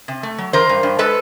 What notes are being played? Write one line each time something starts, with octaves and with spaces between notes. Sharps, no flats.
C3
A3
F#3
E3 A#4 C5
G2
G2
G#3 A4 B4